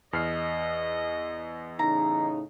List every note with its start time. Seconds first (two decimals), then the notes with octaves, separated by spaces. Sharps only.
0.13 E2 D#5 F6 C7
1.79 A2 C#3 D#4 A#5